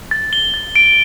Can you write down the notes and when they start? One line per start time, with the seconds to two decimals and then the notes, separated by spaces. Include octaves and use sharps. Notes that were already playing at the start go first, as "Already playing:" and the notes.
0.11 A6
0.33 G7
0.54 A6
0.76 D7